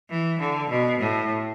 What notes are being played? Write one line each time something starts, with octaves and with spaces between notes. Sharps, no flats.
E3
D3
B2
A2